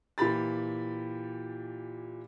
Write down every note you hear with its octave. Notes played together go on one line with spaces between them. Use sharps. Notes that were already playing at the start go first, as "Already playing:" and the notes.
A#2 E3 G4 B5 A6